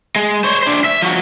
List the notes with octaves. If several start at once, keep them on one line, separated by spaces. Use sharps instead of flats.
G#3
C5 C#5
D4 C5
E5
F3 F#4